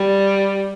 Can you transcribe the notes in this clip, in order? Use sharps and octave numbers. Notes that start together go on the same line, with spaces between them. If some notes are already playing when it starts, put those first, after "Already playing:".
Already playing: G3